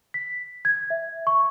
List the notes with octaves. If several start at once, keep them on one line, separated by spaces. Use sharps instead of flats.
B6
G#6
E5
C#6